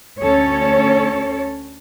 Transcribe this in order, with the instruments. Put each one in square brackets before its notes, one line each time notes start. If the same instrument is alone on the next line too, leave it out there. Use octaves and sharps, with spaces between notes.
[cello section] D2 C#4 A4 C#5